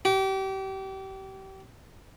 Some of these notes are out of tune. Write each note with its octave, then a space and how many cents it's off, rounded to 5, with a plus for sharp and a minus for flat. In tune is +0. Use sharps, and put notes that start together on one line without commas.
G4 -30